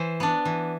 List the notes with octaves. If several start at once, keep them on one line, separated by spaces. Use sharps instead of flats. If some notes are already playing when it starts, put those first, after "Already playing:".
Already playing: E3 C5
B3 D4
E3